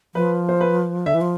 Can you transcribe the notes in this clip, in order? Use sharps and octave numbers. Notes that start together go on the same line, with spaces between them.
F3 B4
C5
B4
D3 E5
E3
F3